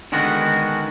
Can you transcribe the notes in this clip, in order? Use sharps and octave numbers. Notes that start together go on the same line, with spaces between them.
D3 D#3 G#3 B3 F#4